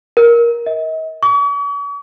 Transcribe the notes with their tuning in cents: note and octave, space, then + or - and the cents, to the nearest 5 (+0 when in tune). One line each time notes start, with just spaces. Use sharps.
A#4 +10
D#5 +40
C#6 +45